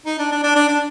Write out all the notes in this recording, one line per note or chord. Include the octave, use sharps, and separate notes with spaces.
D#4
D4
D4
D4
D4
D4